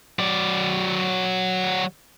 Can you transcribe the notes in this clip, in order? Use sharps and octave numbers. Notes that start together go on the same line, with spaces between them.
F#3 D5